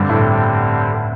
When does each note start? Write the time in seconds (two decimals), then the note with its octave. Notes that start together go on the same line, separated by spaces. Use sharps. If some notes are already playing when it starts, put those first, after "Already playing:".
Already playing: G2 D3 G3 C4
0.09 A2